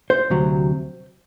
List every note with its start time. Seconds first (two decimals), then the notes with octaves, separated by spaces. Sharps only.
0.10 C5
0.30 D2 C3 F#3